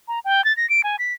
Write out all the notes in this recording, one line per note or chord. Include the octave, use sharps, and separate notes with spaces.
A#5
G5
A6
A#6
D7
G#5
B6